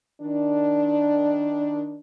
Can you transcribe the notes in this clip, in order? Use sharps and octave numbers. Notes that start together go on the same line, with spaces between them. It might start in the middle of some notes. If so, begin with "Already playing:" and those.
D#3 D4